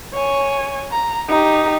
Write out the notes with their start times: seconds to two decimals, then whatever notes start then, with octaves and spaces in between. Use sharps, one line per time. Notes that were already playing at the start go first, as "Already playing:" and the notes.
0.13 C#5 G#5
0.92 A#5
1.29 D#4 G4